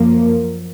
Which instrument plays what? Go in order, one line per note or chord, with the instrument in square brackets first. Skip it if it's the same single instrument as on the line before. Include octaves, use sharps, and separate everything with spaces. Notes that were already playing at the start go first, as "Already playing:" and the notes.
Already playing: [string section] F#2 F3 A#3